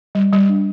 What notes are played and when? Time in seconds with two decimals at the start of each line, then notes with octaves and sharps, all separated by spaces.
0.15 G3
0.32 G3
0.49 D4